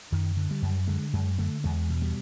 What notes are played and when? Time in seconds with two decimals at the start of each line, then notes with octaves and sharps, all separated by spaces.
0.12 F#2 D#3
0.37 D3
0.51 G3
0.62 F#2
0.88 D3 G#3
1.13 F#2 G#3
1.38 D3 A3
1.64 E2 G#3
1.90 B2
2.02 G3